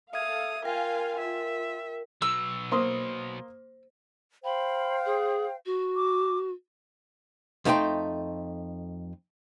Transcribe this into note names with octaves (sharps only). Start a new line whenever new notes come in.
A4 E5 F5 D#6 G#6
F4 A#4 F5 G5 G#5
F4 E5
B2 F#3 E6
A#3 C5 C6 D#6
C5 F5 G5 B5
G#4
F#4
D6
F2 A3 D#4 C5 G5 C6